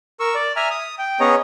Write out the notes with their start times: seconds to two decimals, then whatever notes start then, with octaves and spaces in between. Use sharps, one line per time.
0.20 A#4 C#6 E6
0.35 D5
0.56 E5 G#5 A#5 F6
0.71 D#6
0.99 G5
1.20 B3 C#4 G#4 C#5 D#5 A#5